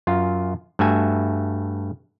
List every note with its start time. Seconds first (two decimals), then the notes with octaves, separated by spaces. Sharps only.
0.07 F#2 F4
0.79 G2 A3 F#4 E5 G#5